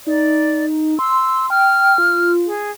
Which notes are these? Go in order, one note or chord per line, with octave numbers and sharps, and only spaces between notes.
D#4 D5
C6 E6
G5 F6
F4
G#4